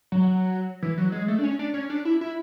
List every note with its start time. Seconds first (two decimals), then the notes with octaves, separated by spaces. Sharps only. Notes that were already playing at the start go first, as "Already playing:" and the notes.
0.12 F#3
0.82 E3
0.98 F#3
1.12 G#3
1.28 A3
1.39 D4
1.43 C#4
1.59 D4
1.74 C#4
1.90 D4
2.05 E4
2.21 E4